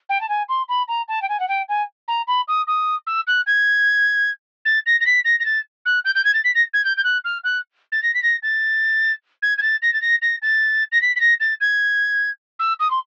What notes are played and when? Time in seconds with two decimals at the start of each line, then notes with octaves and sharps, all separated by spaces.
0.09 G5
0.21 A5
0.29 G#5
0.49 C6
0.69 B5
0.88 A#5
1.08 A5
1.22 G5
1.29 G#5
1.40 F#5
1.48 G5
1.69 G#5
2.08 A#5
2.27 B5
2.48 D#6
2.67 D#6
3.07 E6
3.27 F#6
3.46 G#6
4.65 A6
4.86 A#6
5.01 A#6
5.06 B6
5.25 A#6
5.40 A#6
5.45 A6
5.85 F#6
6.05 G6
6.15 G6
6.25 G#6
6.34 A6
6.44 B6
6.55 A#6
6.73 G#6
6.84 G6
6.97 G6
7.04 F#6
7.24 F6
7.44 F#6
7.92 A6
8.03 A#6
8.14 B6
8.23 A#6
8.43 A6
9.42 G#6
9.58 G#6
9.62 A6
9.82 A#6
9.93 A6
10.02 A#6
10.22 A#6
10.42 A6
10.92 A#6
11.02 B6
11.16 B6
11.20 A#6
11.40 A6
11.61 G#6
12.59 E6
12.80 D#6
12.90 C6